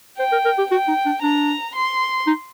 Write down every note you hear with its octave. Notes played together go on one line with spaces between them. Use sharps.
C5 G5
A#4
A#4
G4
F#4 G5
D#4
D4
D4 A#5
C6
D#4